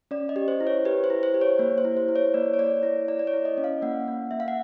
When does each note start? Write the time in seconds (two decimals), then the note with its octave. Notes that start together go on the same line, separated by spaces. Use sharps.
0.11 C#4 D5
0.29 D#5
0.36 G4
0.48 C5
0.61 E4
0.67 C#5
0.85 G4 B4
1.04 C5
1.10 E4
1.23 C5
1.34 G4
1.41 C#5
1.59 A#3
1.78 C5
1.85 E4
1.97 C5
2.08 E4
2.16 C#5
2.34 A#3 D5
2.54 C#5
2.59 A#3 D5
2.83 E4 C#5
3.08 E4 D5
3.19 D5
3.27 C#5
3.33 E4
3.45 D#5
3.58 C#4
3.64 F5
3.82 A#3 F#5
4.08 A#3
4.31 A#3 E5
4.40 F5
4.48 F#5